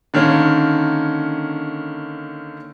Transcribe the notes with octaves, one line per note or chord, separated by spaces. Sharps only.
D3 D#3 A#3 C#4